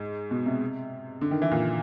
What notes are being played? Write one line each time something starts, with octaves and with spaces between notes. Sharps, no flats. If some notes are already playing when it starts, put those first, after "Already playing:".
Already playing: G#2
B2
C3
D3
D#3
E3
A#2